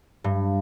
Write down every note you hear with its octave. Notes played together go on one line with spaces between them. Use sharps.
G2